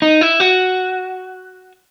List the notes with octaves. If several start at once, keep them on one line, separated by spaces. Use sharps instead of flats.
D#4
E4
F#4